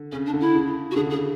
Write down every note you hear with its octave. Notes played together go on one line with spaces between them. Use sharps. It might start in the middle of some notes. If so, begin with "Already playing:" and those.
Already playing: D3
C#3 C#4
D4
D3
E4
C#3
F#4
D3 G#4
C#3 G#4
D3